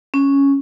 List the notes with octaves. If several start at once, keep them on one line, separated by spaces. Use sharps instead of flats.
C#4